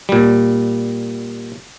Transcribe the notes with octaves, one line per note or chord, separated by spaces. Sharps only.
A#2 G3